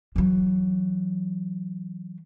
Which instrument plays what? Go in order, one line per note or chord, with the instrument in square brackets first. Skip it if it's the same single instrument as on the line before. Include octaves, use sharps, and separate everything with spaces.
[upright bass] E3 F#3